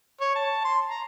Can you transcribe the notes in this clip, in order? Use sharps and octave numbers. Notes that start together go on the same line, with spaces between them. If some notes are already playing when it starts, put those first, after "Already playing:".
C#5
A5
C6
A#5